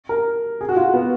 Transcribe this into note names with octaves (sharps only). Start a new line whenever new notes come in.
A#4
G#4
F#4
F4
B3